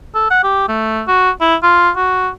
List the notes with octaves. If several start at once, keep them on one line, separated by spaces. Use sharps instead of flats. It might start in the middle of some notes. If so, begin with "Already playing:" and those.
A4
F#5
G4
A3
F#4
E4
F4
F#4